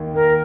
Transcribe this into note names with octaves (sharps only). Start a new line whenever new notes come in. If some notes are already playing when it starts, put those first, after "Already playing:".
Already playing: D#2 D#3
D#2 A#4